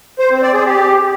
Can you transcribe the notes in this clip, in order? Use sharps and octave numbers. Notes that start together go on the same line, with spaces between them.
C5
C4
D5
G#4
G4